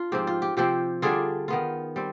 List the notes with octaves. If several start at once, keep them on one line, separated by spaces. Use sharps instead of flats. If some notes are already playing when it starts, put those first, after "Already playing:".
Already playing: D4 F4
G#2 F3 C4 G4
F4
G4
C3 F3 C4 G4
D3 G3 D4 F4 G#4
D#3 B3 F4
G3 C4